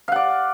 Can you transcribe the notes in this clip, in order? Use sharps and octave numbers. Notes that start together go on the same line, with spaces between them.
D5 F5 F#5